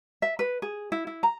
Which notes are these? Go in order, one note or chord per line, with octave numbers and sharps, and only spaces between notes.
E5
B4
G#4
E4
E4
A#5